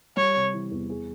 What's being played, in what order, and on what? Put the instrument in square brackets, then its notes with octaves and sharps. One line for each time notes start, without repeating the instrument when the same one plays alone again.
[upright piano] G3 [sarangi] C#5
[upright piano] C3
E3
E2
G#4